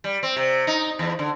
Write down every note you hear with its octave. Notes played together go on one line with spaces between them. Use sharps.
G3
C4
C3
D#4
E2
D3